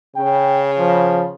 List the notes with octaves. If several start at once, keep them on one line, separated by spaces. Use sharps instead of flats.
C#3 G5
F3